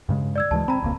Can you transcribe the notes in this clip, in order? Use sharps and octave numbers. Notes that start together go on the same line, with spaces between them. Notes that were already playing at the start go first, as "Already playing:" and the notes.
G2 C#3 G#3
D5 E6 G#6
D2 E3 G#3 A5
C4 A#5 B5
D#1 C#2 A#3